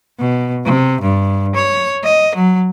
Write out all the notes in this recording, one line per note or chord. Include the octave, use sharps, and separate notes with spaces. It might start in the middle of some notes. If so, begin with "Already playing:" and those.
B2
C3
G2
C#5
D#5
F#3